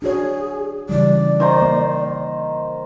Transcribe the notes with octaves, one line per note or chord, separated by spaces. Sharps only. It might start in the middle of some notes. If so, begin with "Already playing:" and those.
D4 F#4 G#4 C#5
C#3 E3 G3 D5
D#3 C5 A#5
A#3